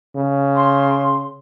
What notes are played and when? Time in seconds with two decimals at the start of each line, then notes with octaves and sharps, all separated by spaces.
0.16 C#3
0.56 C6